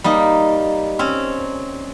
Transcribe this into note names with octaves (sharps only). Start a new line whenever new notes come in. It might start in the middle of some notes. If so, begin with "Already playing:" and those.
G3 A#3 D#4
C4 C#4